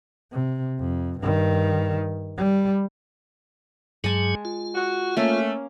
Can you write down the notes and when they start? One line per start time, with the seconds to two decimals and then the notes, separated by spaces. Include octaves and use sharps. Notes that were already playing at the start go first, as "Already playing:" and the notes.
0.32 C3
0.79 F2
1.20 G2 D#3
2.37 G3
4.04 G2 F#3 G#3 G#4 G#5 A5
4.45 F4
4.75 F#4
5.17 A3 A#3 C#4